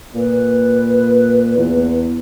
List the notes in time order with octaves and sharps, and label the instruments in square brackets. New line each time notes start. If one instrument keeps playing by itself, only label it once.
[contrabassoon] A#2 [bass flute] B4
[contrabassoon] E2